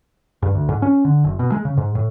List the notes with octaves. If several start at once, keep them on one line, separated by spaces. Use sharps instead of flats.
G2
D2
G#2
C#4
D3
F#1
B2
G#3
C#3
G#2
A2